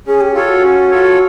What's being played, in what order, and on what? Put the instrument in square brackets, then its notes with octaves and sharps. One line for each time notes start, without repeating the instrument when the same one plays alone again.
[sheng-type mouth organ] C#4 [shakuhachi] G#4
[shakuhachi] G4
[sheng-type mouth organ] F4 A4 C#5 [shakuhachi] G4
[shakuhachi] F#4
[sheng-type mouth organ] C#4
F4 A4 C#5